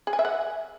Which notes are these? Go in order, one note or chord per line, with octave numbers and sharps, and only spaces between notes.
G#4
G#5
E5
F#5